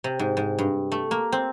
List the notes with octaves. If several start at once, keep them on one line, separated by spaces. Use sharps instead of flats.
C3
G#2
G#2
G2
A3
A#3
C4